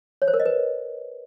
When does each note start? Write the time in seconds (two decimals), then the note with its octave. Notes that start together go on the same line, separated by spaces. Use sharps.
0.22 C#5
0.28 C5
0.34 A#4
0.40 D#5
0.46 B4